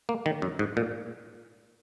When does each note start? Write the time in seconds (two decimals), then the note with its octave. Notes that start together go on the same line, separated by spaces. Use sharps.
0.09 A#3
0.26 D#3
0.42 F#2
0.59 G#2
0.77 A#2